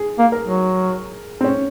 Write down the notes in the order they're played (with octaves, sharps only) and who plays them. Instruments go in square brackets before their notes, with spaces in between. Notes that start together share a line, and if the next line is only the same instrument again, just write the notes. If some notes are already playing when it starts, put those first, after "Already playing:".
Already playing: [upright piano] G#4
[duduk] A#3
[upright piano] A#4
[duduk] F#3
[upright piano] C4
C#4